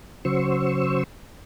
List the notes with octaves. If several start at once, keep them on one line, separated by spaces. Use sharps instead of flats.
C#3 F#3 C5 C#6 E6